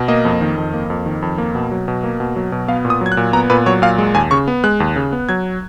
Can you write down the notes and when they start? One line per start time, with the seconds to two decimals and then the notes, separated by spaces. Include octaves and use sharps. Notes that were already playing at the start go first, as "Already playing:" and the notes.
Already playing: B2
0.08 A#3 D#5
0.25 F2
0.41 D#3
0.57 F2
0.74 A#3
0.90 F2
1.06 D#3
1.22 F2
1.38 A#3
1.55 B2
1.71 F#3
1.88 B2
2.03 A#3
2.20 B2
2.36 F#3
2.52 B2
2.68 B3 F5
2.85 A#2
2.90 D#6
3.01 F#3
3.06 G#6
3.12 F#6
3.17 A#2
3.33 B3 A#5
3.50 A#2 B4
3.66 F#3 C#5
3.82 A#2 F5
3.98 G#3
4.14 D#2 G#5
4.31 C#3 C#6
4.48 B3
4.64 G#3 F#6
4.80 D#2
4.96 C#3
5.12 B3
5.29 F#3 G#6